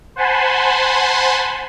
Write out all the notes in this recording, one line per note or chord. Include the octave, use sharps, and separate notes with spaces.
C5 F#5 G#5 A5 B5 C6